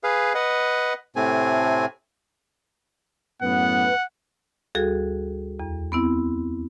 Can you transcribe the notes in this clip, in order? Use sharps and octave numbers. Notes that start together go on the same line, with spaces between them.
G#4 B4 F5
B4 D#5 F#5
A2 C3 A3 C4 G#5
F#2 A2 B3 B4 F#5
D2 G3 F#4 G#4 A4
E2
B3 C4 E4